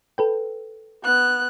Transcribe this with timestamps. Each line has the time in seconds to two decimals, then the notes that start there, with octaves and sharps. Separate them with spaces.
0.18 A4 B4 G5
1.03 B3 F#6